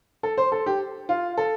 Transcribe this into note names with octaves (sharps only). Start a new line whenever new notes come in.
A4
C5
A4
G4
F4
A4